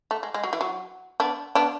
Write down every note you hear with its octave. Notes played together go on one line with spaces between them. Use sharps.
A3
G#3
G#3
F#3
E3
F#3
B3 D4
B3 D4